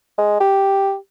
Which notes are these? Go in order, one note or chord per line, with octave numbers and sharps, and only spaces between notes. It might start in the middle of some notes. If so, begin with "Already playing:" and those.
G#3
G4